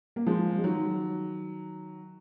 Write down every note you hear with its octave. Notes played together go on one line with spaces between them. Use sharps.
A#3
F3 G#3
G#3
D#3 F#3